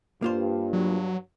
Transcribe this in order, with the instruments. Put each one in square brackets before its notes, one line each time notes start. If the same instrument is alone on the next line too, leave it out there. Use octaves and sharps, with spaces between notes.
[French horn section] G2 [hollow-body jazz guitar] A#3 F4 C5
[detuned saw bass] F#3